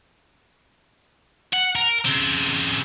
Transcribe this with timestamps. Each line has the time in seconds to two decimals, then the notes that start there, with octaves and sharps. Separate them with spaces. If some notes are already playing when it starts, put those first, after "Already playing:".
1.53 F#5
1.75 A#4
2.05 C#3 C4